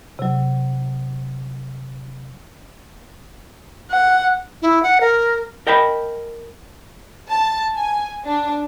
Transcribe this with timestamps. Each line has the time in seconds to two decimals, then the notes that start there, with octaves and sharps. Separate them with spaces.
0.19 C3 F#3
3.91 F#5
4.62 E4
4.83 F#5
5.01 A#4
5.67 A#4 D#5 G5 A5 B5
7.30 A5
7.75 G#5
8.25 D4